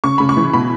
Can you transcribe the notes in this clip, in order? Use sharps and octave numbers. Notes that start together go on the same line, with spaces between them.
C#3 C#6
C#3 B5
C#6
E3
B2 B5